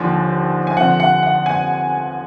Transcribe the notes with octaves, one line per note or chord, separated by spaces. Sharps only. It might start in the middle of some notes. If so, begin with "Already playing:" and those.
Already playing: D#2 D3 F3 G#5
G#5
F2 D3 F3 F#5
F#5
F#5
G#5